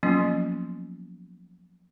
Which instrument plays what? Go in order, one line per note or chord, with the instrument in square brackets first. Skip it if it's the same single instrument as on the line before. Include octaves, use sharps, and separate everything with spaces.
[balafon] F3 F#3 A#3 B3 C#4 F4